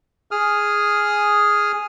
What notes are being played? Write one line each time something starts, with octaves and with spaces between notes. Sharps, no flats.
G#4 D#6 F6